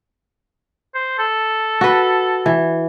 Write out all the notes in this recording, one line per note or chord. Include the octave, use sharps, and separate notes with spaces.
C5
A4
F#4 B4
E3